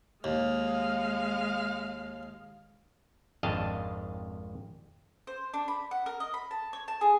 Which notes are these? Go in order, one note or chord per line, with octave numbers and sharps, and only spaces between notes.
D#2 G#3 F5
G#1 F2 D4 D#5 F5 A5
C5
D4
B5
F#5
A#4
D#5
B5
A5
C#5
A5
G#4